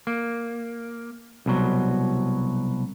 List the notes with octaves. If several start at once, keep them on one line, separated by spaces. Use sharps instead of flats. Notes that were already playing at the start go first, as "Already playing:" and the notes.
A#3
C2 B2 F#3